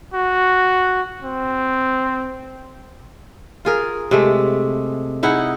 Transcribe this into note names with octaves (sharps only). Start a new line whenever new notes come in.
F#4
C4
F4 G#4 A#4
C3 G#3 A3
D#4 E4 G#4 F#5